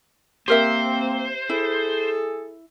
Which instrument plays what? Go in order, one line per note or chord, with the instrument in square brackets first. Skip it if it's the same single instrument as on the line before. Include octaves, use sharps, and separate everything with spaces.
[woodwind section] A#3 C4 [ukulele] G4 A#4 E5 [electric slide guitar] C5
[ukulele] E4 [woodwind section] G#4 A4